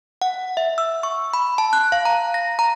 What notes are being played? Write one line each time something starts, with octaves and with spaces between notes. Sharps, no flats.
F#5
E5
E6
C#6
B5
A5
F#6
F5
A#5
A#6
A#5